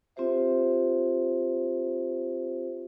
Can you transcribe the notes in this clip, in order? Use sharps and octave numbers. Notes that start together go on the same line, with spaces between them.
C4 F4 G4 C5 E5